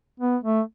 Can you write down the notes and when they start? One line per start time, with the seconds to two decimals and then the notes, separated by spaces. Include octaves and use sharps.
0.20 B3
0.44 A3